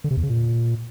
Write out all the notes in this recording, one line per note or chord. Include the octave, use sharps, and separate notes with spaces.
D3
C3
E2
C#3
A#2